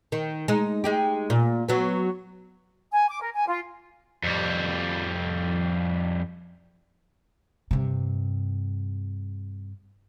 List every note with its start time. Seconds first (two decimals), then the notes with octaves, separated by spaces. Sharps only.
0.12 D#3
0.48 G#3 D#4
0.84 G#3 D#4 G4
1.30 A#2
1.69 F#3 B3
2.92 G#5
3.08 D6
3.20 A#4
3.34 G#5
3.47 F4
4.23 F2 G3
7.71 G2 C3